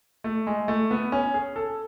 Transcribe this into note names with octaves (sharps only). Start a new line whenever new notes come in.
A3
G#3
A3
B3
C#4
G#4
A4